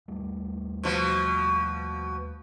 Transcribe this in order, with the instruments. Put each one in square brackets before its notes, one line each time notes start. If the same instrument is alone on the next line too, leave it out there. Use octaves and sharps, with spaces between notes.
[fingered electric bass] D#2 G3 A3
[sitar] B2 F3